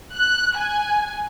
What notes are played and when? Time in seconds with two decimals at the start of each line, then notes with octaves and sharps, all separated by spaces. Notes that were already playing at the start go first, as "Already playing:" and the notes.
0.16 F#6
0.58 G#5